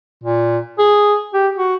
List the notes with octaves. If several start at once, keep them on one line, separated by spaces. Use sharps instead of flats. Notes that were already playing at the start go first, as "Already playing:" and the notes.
A#2
G#4
G4
F#4